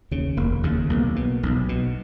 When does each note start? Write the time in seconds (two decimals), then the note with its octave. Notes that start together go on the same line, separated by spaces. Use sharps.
0.11 D#2 C#3
0.37 F1 A#3
0.63 D#2 C#3
0.90 B1 A#3
1.16 B2
1.43 B1
1.69 B2